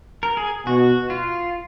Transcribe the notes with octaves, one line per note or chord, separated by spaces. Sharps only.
A#4
G#4
B2 F#4
F4